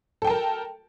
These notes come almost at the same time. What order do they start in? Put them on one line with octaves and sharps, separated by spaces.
A4 G5 A5 A#4